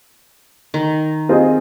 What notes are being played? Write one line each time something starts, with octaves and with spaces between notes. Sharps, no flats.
D#3
C4 F4 G#4 D#5